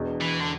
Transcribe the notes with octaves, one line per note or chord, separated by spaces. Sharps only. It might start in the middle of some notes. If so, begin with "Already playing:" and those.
Already playing: E1 E2 B2
E3
D3